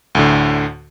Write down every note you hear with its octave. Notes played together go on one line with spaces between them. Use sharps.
D2 A2 D3